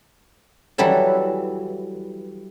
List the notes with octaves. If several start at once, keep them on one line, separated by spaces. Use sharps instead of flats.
E3 F#3 G3 E4 A4